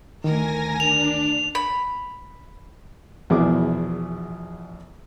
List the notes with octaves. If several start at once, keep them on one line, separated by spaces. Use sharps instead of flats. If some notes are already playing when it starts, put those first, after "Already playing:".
D2 D#3 A#4 G#5 A#6
D4 F7
B5
A#1 E2 B2 E4 G#4 D6